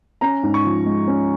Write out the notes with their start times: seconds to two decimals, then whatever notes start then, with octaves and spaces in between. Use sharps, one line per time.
0.21 C#4 A#5
0.43 G#2
0.54 C#6
0.65 F3
0.86 G#3
1.08 C#4